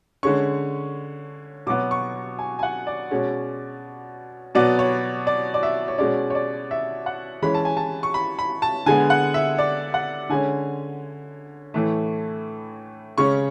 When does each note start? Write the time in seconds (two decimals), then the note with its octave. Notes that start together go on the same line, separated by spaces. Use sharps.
0.23 D3 G#3 C#4 C#6
1.67 B2 F#3 B3 D6
1.91 C#6
2.39 G#5
2.59 G#5
2.63 F#5
2.87 D5
3.11 B2 G#3 C#4
4.55 B2 F#3 B3 D5
4.79 C#5
5.27 D5
5.54 D5
5.63 E5
5.88 C#5
5.98 B2 G#3 C#4 D5
6.30 C#5
6.35 D5
6.71 E5
7.06 F#5
7.42 E3 G#3 C#4 B5
7.54 A5
7.65 G#5
7.77 A5
8.03 C#6
8.14 B5
8.39 B5
8.62 A5
8.86 D3 G#3 B3 G#5
9.10 F#5
9.34 E5
9.58 D5
9.94 F#5
10.29 D3 G#3 C#4 G#5
11.74 A2 E3 A3
13.18 C#3 G#3 C#4 C#6